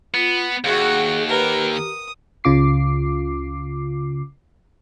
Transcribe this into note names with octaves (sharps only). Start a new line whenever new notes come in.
B3 F4
D#2 F#4 G#4 F#5
G4 A#4 B4
D#6
C#2 C#3 F4 D6 C7